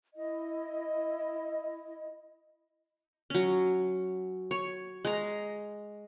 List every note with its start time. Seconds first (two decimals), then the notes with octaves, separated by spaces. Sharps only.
0.15 E4 D#5
3.30 F#3 C#4
4.51 C#5
5.05 G#3 A#5